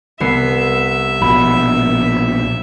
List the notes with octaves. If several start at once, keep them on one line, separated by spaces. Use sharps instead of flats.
C2 B3 E5 C7
A#1 B2 B5